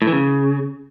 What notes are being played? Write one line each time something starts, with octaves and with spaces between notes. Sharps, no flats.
A2
E3
C#3